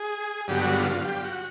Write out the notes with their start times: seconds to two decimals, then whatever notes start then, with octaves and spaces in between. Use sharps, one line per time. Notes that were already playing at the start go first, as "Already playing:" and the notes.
Already playing: G#4
0.48 G2 D3 F#3 B3 G4
0.62 F#4
0.77 F4
0.91 F4
1.04 G4
1.24 F#4